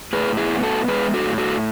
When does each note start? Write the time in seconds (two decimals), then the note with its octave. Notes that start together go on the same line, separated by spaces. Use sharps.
0.13 A2 G#4 B4
0.37 E4 G#4
0.50 B3
0.63 F#4 A4
0.88 G#3 G#4 B4
1.14 F#4 A4
1.26 A2
1.38 F#4 A4